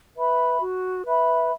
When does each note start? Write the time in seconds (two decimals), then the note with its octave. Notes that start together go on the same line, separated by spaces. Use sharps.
0.15 B4 E5 B5
0.60 F#4
1.06 B4 E5 B5